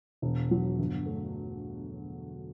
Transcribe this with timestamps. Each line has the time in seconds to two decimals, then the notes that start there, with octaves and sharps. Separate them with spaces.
0.22 E1
0.51 F#3
0.79 G1
1.06 A3